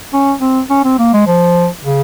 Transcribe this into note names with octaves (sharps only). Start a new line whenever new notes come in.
C#4
C4
C#4
C4
A#3
G#3
F3
C#3